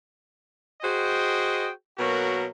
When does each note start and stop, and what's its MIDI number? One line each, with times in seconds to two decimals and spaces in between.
0.82 1.69 66
0.82 1.69 68
0.82 1.69 72
0.82 1.69 75
0.82 1.69 79
1.98 2.45 47
1.98 2.45 54
1.98 2.45 58
1.98 2.45 66
1.98 2.45 70